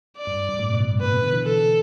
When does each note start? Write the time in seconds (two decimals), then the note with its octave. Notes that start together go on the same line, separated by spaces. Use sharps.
0.17 D5
0.27 G2
0.49 G2
0.59 A2
0.69 B2
0.80 B2
0.91 G2
1.01 A2 B4
1.12 B2
1.22 D3
1.33 E3
1.44 A4